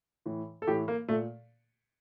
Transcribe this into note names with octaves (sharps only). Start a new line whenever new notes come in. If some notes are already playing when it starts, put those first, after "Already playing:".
A2 E3
A4
A2 E3 G4
A#3
A#2 A3